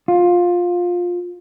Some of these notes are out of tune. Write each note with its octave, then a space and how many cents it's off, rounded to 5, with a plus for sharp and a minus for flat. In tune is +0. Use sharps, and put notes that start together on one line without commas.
F4 +15